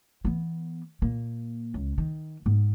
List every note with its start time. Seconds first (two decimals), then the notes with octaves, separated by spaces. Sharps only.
0.25 E3 B3
1.02 A#2 A#3
1.74 C#2
1.98 D#3
2.46 G#2 B3